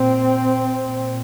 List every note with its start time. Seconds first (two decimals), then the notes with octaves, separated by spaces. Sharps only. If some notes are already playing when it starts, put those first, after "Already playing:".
Already playing: A#2 C4
0.83 A#2